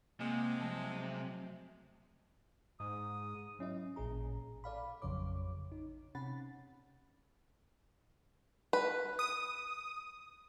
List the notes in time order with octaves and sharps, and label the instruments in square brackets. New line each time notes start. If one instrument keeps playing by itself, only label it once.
[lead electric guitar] C3 [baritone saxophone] G#3 [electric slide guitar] A#3 [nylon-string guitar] F#5
[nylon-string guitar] F3 A3 [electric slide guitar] F#3 A5
[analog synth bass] G#2 [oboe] D#6
[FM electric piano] F#3 C#4 E4 D#5
A1 A#2 C#4 G#4 A#5
A4 D5 F5 B5
A1 F2 C#3 F#3 C#5 D6
D#4
C3 C#4 F#5 B5 A6
[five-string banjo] B4
[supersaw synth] D#6